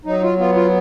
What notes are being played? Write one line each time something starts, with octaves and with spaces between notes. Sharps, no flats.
F#3 D#4
F4
B3 F4
F4